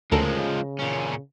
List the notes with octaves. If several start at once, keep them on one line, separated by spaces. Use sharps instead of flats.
D2 C#3 F3 G#3 A4 A#4
A#2 C#4